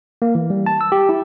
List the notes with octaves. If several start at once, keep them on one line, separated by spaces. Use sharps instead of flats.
A#3
E3
G3
A5
E6
G4
E4